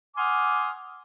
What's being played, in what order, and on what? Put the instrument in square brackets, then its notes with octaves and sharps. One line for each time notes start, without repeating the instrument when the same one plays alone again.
[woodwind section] F#5 G#5 C6 D6 D#6 F6